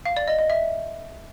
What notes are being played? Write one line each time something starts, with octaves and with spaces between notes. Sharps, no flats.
F5
D5
D#5
D#5
E5